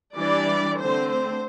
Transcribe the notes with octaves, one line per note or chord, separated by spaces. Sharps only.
E3 G3 D4 D5
D3 A3 C4 C5
C5